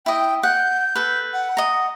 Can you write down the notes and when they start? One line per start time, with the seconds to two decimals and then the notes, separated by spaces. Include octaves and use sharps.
0.06 E4 D#5 G5
0.43 F#5 G6
0.95 A4 B4
1.33 F#5
1.57 D#5 A#5